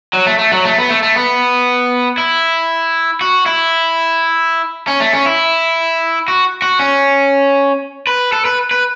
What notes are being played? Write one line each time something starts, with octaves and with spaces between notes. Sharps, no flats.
F#3
A3
A3
F#3
A3
B3
A3
A3
B3
E4
F#4
E4
C#4
A3
C#4
E4
F#4
F#4
C#4
B4
A4
B4
B4